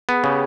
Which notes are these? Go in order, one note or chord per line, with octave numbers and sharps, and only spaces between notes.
B3 G#4
C#3 G4